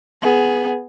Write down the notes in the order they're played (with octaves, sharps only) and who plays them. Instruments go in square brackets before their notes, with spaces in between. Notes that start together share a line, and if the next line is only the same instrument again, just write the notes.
[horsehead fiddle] B3 G#4